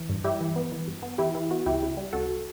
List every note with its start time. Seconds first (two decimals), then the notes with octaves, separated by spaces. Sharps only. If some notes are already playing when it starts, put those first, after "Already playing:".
Already playing: E3
0.09 G2
0.24 G3 E4 G4
0.41 E3
0.56 B3
0.72 E3
0.88 G2
1.03 B3
1.18 E3 E4 G4
1.35 E3 E4
1.51 B3 F#4
1.66 C#2 E4 G4
1.82 C#3
1.97 G3
2.13 C#2 F#4 A4